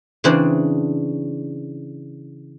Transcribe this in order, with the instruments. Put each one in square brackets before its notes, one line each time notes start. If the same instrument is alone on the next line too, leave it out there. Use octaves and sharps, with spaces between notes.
[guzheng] C#3 E3 C4 D4 C5